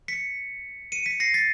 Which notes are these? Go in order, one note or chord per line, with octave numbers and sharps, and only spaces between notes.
B6 C#7
C#7 D#7
B6 C#7
A#6 C7
A6 B6